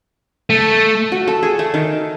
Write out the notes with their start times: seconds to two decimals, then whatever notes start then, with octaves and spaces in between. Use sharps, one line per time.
0.50 A3
1.12 F#4
1.28 A4
1.43 G#4
1.59 A3
1.74 D#3